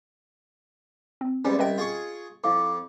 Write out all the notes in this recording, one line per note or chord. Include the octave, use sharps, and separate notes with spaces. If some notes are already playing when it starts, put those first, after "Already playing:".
C4
E2 G#2 G3 C#4
C2 B4 D#5 E5 G5
F4 G#4 C#6
F2 E4 F5 D6